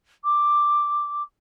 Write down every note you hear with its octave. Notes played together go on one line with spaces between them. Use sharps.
D6